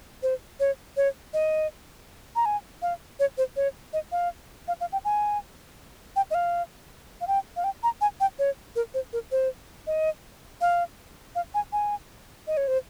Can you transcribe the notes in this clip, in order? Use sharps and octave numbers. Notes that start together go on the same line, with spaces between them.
C5
C#5
C#5
D#5
A#5
G#5
F5
C#5
C5
C#5
D#5
F5
F5
F5
G5
G#5
G5
D#5
F5
F5
G5
F5
G5
A#5
G#5
G5
C#5
A#4
C5
A#4
C5
D#5
F5
F5
G#5
G#5
D#5
C#5
C5